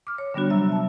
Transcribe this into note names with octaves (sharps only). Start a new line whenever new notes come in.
D6 F6
C#5
D3 G3 B3 D4 F#4
C3 F#3 E5 A#5 E6
A5